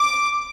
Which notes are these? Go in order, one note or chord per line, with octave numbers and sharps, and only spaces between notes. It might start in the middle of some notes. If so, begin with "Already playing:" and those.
Already playing: D6